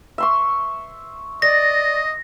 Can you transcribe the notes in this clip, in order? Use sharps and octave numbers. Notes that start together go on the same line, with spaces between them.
E5 C6 C#6
D5 D#5 A#6